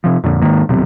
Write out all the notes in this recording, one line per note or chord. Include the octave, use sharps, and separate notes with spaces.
C3 F3
F2 A#2 D3
G#2 D#3 A#3
D#1 B1 C3